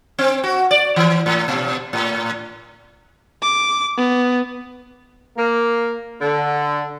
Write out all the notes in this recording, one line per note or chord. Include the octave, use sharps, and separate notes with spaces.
C4
F#4
D5
E3
A2
B2
A2
D6
B3
A#3
D3